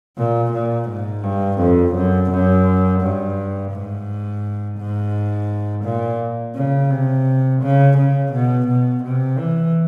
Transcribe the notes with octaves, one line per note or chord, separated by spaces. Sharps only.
A#2
A#2
G#2
G2
F2
F#2
F#2
G2
G#2
G#2
A#2
C#3
C3
C#3
C#3
B2
B2
C3
E3